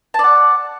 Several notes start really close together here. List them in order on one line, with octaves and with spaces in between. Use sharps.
A5 D5 F#5